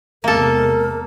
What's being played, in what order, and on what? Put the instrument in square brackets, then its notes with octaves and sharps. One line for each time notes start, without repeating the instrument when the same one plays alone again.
[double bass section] E2 C3 G#3 [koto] A#3 A4 [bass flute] A#4